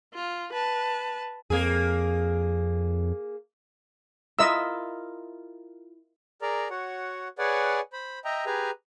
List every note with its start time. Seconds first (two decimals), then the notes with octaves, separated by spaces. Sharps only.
0.15 F4
0.53 B4 A5
1.50 F2 A#3 G#4
4.39 E4 F4 A#4 D#5 E5 E6
6.42 G#4 A#4 D5 A#5
6.70 F#4 C#5 F#5
7.38 G#4 B4 C#5 D5 F#5 G#5
7.93 C5 B5
8.25 D#5 E5 G5 A#5
8.46 G4 G#4 B4 G#5 A#5